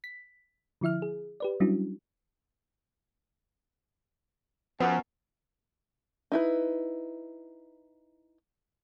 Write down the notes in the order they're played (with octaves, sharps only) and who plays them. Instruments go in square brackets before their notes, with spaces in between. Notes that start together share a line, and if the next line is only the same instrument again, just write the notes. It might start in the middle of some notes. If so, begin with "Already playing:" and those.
[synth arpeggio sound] B6
D3 F3 E4 E5 F6
G#4
G4 B4 D5
F#3 G3 C#4 D4 E4 F#4
[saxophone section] F#2 [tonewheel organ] F3 [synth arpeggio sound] B3
[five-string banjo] D#4 E4 B4